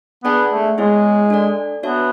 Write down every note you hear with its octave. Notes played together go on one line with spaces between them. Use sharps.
B3 D4 G#4 D5 F#5 A5
A3
G#3 B3 E4 G#4 C#5 F#5
D4 A4 D5
B3 D4 F#4 C#5 E5 A5